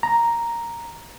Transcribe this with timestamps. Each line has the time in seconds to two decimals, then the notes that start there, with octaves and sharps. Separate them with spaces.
0.03 A#5